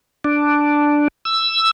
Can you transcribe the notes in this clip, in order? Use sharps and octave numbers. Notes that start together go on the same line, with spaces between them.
D4
E6